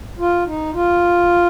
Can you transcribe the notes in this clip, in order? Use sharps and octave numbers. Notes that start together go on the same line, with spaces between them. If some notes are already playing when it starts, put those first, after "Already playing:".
F4
D#4
F4